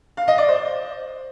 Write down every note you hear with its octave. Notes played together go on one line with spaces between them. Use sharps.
F5
D#5
D5
C5